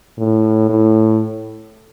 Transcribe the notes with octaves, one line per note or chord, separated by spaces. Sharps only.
A2
A2